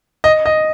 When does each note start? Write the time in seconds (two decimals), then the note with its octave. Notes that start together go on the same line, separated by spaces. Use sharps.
0.24 D#5
0.46 D#5